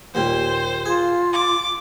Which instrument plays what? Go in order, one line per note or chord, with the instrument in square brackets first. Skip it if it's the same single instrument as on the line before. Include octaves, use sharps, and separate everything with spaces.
[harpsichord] D#2 A#2 G3 [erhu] C5
[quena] F4 [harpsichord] G#4
[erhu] D6